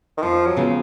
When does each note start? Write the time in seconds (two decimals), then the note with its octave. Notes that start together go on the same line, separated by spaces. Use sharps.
0.17 D#3
0.23 F2 F3
0.46 F#3
0.57 C#3 F3 B3